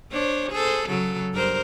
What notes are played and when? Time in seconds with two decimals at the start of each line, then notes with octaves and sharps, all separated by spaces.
0.11 D4 C5 C#5
0.52 G#4 A4 C5
0.88 C#3 F#3 A4
1.33 G2 A#4 C5